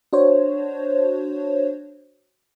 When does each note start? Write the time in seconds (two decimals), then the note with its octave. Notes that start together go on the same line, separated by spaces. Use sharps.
0.13 D4 F#4 C5 C#5